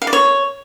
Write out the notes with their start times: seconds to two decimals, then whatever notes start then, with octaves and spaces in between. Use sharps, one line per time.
0.02 F5
0.07 D5
0.13 C#5